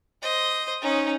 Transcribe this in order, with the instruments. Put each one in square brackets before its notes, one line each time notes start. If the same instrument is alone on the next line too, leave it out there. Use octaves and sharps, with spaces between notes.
[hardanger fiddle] C5 D#5
C#4 D#4